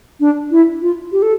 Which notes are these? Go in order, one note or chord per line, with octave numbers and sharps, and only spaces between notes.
D4
E4
F4
G4
A4